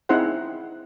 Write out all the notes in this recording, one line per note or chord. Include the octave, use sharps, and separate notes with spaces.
C4 D#4 E4 G#4 C5 F#5